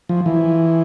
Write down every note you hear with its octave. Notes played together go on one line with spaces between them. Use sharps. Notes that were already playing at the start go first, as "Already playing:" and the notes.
F3
E3